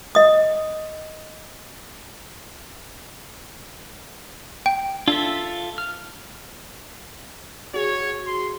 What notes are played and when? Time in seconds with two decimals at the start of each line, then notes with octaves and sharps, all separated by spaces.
0.15 D#5 D#6
4.66 G5
5.08 D4 F4 A4 E5
5.78 F6
7.74 F#4 G#4 C#5
8.27 C6